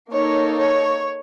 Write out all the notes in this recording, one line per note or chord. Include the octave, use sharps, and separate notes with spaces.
A#3 D#4 A4 C#5
C#5